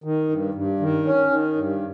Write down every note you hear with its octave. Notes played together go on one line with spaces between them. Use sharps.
D#3
G2
G2
D#3
C#4
D#3
G2